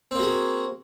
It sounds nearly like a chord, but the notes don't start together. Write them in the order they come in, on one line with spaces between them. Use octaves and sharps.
C4 A#3 F#4 G#4